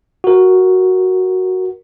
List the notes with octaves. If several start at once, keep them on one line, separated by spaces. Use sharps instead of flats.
F#4 A#4